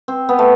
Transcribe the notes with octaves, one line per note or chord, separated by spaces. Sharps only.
C4
B3
A3